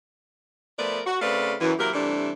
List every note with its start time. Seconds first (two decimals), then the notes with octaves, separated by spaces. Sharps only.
0.78 F3 A3 B3 A#4 B4 D5
1.06 F#4
1.21 C#3 A3 C4 B4 D5 F5
1.61 F#2 E3
1.78 C3 F#3 A#3 E4 G4 A#4
1.93 C3 E3 G3 A3 D4